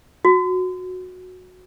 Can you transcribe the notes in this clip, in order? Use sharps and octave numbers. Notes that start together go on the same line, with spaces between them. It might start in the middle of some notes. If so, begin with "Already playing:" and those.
F#4